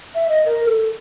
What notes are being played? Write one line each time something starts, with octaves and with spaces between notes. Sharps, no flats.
E5
D#5
A#4
A4